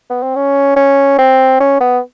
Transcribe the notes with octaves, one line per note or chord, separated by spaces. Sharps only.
B3
C4
C#4
C#4
C4
C#4
B3